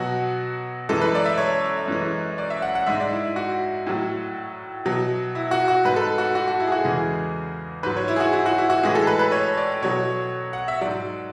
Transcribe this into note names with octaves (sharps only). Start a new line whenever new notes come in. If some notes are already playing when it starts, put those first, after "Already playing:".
Already playing: B2 F#3 F#4
F#2 E3 G#3 A4
B4
D5
E5
C#5
F#2 E3 G#3
D5
E5
F#5
F#5
G#2 G#3 E5
D5
E4
F#4
A2 F#3
B2 F#3
E4
F#4
F#4
G#2 G#3 B4
A4
B4
F#4
F#4
F#4
E4
G#4
F#4
E2 C#3 E3 G#3 G#4
G#2 F#3 B4
C#5
E4
G#4
F#4
E4
F#4
E4
F#4
A2 E3 G#3 G#4
A4
B4
B4
C#5
D5
B2 F#3 C#5
F#5
E5
G#2 F#3 D5